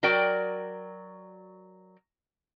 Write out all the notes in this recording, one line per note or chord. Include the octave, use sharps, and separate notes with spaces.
F#3 F#4 A#4 D5 G5